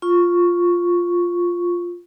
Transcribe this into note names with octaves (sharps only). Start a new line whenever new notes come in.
F4 C#6